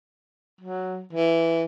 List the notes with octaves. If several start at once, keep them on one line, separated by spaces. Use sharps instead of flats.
F#3
E3